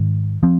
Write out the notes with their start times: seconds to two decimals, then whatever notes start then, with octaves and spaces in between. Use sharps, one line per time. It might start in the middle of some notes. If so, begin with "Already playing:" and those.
Already playing: G#2 D#3
0.43 F3 C4